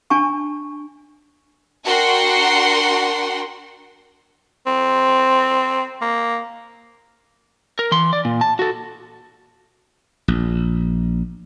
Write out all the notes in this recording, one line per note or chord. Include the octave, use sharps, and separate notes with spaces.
D4 G#5 A5 C#6
D4 F#4 A#4 F#5 G5 C6
C4
A#3
A#4
E3 C6
D5
A#2
A5
F#4 A4
A#1